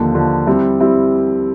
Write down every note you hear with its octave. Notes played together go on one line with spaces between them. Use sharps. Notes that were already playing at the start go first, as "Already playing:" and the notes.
Already playing: D#2 D3 F3
D#2 D3 F3
G3 C4 E4
G3 C4 E4